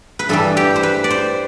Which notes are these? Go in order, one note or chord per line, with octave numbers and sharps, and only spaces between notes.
B4
G2 E3 G3 A4
G4
C5
B4
D5
C5